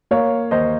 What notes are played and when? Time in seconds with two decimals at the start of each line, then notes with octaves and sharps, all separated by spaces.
0.11 A#3 C#5 F5
0.51 D#2 C5 D#5